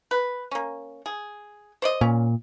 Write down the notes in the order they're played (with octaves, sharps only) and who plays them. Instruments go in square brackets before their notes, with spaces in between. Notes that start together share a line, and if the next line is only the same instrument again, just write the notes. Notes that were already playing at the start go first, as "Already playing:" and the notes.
[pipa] B4
A#3 C#4
G#4
C5 D5 D#5
[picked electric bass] A#2 [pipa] C#4